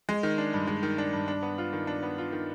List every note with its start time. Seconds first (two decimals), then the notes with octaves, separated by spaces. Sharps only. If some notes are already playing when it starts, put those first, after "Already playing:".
0.09 G#3
0.23 D#3
0.38 D4
0.54 G2
0.67 G#3
0.83 D#3
0.98 D4
1.13 G2
1.28 D4
1.43 B3
1.58 F4
1.73 D#3
1.87 D4
2.03 B3
2.18 F4
2.32 D#3